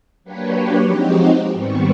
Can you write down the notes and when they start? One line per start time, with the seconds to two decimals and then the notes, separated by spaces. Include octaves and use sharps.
0.24 F#3 A#3 D4 G4 B4 C#5
0.83 F3 G#3 C4 D#4 F#4 G4
1.53 G#2 D#3 G3 B3 C4 C#6